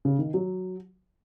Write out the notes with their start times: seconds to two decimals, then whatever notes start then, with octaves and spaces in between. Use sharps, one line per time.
0.05 C#3
0.19 D#3
0.34 F#3